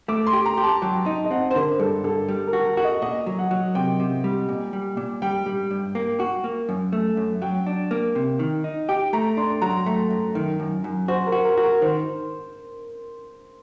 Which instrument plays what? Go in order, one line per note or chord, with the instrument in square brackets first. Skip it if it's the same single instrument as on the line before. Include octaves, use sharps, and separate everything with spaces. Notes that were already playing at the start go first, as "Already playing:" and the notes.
[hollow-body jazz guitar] A3 [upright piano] D6
[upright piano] C6
[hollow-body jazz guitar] G4
[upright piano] A#5
[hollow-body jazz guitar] G4
[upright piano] A5
[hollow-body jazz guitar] F#3 [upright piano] G5
[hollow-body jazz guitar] D#4
[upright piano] D#5
[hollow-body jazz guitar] C4 [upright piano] F#5
[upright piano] C5
[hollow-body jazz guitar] D3 [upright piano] A#4
[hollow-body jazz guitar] G2 [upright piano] A4
[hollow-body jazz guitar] D3 [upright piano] A4
[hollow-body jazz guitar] G3
[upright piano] A#4
[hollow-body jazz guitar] F#4
[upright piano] A#4
[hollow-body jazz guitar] F#4 [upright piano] F#5
[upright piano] D#5
[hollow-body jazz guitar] A#2 [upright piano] D#5
[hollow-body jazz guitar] F#3
[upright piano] F#5
[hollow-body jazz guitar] F#3
[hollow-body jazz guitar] C3 [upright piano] G5
[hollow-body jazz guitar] C3
G3
A#2
G3
A#2
[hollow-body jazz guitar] G3 [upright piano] G5
[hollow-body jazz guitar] G3
G2
A#3
F#4
A#3
F#2
A3
F#2
[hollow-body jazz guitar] F#3 [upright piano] G5
[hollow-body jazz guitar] D4
A#3
C3
D#3
D#4
[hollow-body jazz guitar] G4 [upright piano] G5
[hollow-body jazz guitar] A3 [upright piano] A#5
[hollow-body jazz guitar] D4 [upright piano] C6
[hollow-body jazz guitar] F#3 [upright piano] A#5
[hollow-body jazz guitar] A3
F#2
D#3
F#2
F#2
[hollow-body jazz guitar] F#4 [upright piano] C5
[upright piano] A#4
[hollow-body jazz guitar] F#4
[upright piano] A#4
[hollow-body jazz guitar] F#4
[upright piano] A#4
[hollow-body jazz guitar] D#3 [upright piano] C5